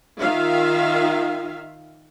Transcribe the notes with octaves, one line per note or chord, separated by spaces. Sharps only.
D#3 F4 E5 F5